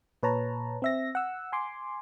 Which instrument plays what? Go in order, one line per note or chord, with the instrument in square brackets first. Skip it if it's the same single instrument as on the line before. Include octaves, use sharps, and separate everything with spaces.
[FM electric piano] A#2 B4 C#5 A5 A#5
C4 E5 A#6
F#5 E6
G#5 C6 D6